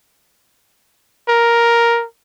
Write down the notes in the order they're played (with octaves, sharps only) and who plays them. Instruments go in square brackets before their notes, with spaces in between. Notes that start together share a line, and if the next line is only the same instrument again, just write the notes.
[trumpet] A#4